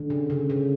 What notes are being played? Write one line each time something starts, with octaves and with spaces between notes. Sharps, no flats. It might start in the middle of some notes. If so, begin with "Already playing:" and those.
Already playing: D3
C#3
C#3
C#3